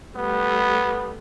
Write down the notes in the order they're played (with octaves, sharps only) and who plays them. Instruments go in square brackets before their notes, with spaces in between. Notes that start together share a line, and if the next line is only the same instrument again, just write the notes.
[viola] G3 A3 [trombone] B3